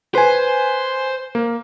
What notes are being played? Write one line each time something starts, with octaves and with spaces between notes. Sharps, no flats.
B4 C5 G#5
A#3